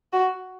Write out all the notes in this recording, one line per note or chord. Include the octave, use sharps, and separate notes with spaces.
F#4